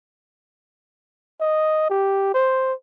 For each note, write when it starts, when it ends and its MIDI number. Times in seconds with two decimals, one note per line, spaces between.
1.41 1.86 75
1.90 2.29 67
2.34 2.73 72